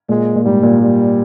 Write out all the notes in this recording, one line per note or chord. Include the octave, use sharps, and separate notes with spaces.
A#2 G#3
A#2
G#2 G3
A#2
G3